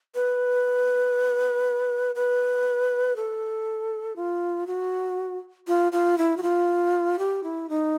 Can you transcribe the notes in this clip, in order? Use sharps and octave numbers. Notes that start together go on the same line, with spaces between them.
B4
B4
A4
F4
F#4
F4
F4
E4
F#4
F4
G4
E4
D#4